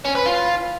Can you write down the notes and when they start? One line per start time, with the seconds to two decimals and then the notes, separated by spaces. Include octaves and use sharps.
0.05 C#4
0.15 B4
0.26 F4